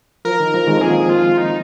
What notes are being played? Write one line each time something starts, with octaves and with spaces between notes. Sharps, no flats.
F3 A#4
D#3
F3
D#3 G#3
C4
F3 A#3 G#4
F4
D#4